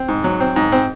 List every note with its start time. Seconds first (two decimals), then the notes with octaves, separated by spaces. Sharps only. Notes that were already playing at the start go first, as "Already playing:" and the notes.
Already playing: C4
0.08 G#2
0.24 F#3
0.40 C4
0.56 G#2
0.72 C4